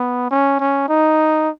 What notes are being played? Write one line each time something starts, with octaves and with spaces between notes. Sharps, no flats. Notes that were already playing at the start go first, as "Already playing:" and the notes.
Already playing: B3
C#4
C#4
D#4